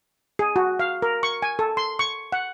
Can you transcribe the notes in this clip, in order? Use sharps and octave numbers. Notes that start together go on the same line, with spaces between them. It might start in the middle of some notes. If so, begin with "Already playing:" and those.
G#4
F#4
F5
A#4
C#6
G#5
A4
C6
C#6
F#5